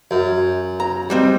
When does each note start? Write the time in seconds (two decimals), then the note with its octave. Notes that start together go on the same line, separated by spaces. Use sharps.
0.11 F#2
0.80 A#5
1.10 G3 G#3 C4